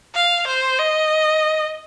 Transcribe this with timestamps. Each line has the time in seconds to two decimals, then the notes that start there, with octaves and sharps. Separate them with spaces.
0.15 F5
0.48 C5
0.79 D#5